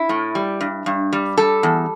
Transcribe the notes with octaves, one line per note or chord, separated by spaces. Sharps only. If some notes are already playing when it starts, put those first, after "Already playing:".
Already playing: E4
A2
G3
G2
G2
G3
G3 A4
E2